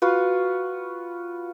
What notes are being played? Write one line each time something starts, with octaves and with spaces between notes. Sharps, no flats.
F4 F#4 B4